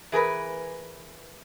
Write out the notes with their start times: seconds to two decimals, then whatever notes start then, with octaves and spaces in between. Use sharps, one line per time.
0.12 E3 G#4 A#4 B4